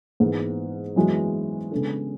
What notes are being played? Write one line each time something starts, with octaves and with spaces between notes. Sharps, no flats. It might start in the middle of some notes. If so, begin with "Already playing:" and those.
G#2 E3 B3
F#2 E3 G#3 B3 F#4
C#3 G#3 B3 D4 A4